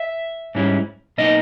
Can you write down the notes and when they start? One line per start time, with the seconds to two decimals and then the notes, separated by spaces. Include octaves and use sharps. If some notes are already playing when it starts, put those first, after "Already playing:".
Already playing: E5
0.55 G#2 G3 C#4 E4
1.18 B2 A#3 D#4 D#5